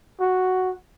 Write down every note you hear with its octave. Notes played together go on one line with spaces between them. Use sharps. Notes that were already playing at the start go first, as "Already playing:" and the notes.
F#4